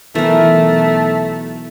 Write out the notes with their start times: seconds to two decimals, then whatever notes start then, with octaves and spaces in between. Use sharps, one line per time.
0.15 B1 E3 A3 A#4